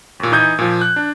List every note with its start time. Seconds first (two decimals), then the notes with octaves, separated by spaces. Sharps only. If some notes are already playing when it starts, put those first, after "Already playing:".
0.20 D#2 A#2
0.32 E3 D#4 D#6 G6 G#6
0.59 A#2 F3
0.81 F#6
0.96 D4